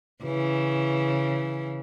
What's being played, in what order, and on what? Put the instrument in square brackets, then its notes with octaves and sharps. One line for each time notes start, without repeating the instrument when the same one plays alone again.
[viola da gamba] C#3 E3